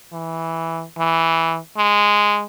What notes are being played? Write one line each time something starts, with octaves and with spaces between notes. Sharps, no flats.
E3
E3
G#3